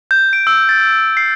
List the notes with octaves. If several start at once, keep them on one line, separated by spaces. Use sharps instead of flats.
G6
D7
E6
A6
C7